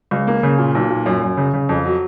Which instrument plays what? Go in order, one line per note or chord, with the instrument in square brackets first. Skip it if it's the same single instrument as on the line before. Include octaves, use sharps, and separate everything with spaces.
[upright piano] C#2
A#3
C#3
A#2
B1
A#2
F#2
F#2
C#3
C#3
F2
F#3